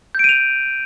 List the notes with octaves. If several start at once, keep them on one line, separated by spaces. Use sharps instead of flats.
G6 D7 D#7 F7